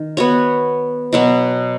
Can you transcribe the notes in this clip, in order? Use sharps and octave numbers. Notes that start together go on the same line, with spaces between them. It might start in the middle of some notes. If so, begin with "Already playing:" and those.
Already playing: D#3
B3 F#4 C#5
B2 F#3 B3